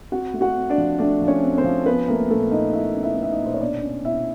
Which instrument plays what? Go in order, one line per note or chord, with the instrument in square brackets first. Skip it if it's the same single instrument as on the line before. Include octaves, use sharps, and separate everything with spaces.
[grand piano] C4 F#4 F#5
A3
F#4 F#5
C4
D4 D5
F3
A3 D4 D5
F3
C#4 C#5
C4
C4 C5
F3
B3 C#4 B4
A3 A#3 A#4
A#2 A3 A4
A#2 D#4 D#5
A#2 E4 E5
C#4
E4 E5
A3
E5
D#4 D#5
A#2
C5
C#5
B2 D4 D5
C#4
B2 E4 E5